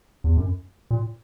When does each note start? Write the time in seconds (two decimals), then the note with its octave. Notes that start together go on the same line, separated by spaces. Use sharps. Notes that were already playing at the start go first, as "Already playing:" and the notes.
0.24 E2
0.37 F#2
0.91 A#2